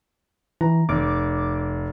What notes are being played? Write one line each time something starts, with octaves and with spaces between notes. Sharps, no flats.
E3 A#5
F1 D6